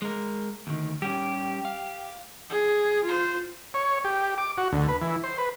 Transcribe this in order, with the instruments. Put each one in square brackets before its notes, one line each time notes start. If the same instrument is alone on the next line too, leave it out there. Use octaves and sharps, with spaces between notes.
[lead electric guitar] G#3 A#4
D2 D#3
[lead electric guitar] G3 C#4 [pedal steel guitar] G4
[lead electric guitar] F5
[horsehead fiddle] G#4
F4 C5
[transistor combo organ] C#5
G4
D6
F#4
D2
B4
E3
C5
B4